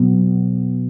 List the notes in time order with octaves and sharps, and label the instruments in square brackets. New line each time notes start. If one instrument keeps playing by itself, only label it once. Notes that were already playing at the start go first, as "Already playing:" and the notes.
Already playing: [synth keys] B2 F#3 B3